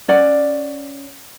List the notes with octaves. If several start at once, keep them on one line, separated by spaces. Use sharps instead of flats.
C#4 D5 F#5